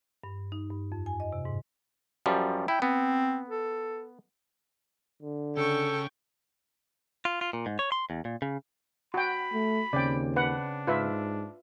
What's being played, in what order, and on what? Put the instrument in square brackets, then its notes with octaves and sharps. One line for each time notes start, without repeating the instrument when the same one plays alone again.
[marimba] G2
D#4
G2
F2
G#5
D#5
C3
G#2
[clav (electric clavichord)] F#2 F3 G3
[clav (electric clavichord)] E4 [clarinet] G5
[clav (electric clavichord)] B3 [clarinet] C4
[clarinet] A4
[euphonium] D3
[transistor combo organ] C#3 [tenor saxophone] A4 [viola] G5 C#6
[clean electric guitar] F4
F4
A#2
G#2
C#5
C6
E2
A#2
C#3
[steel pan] F#4 G5 [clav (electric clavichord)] F#5 [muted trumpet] B5
[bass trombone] A3
[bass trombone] D#2 [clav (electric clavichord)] C#3 C4 [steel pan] D5 G5
[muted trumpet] D4 [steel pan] B4 F#5
[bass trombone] G#2 [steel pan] F4 B4 E5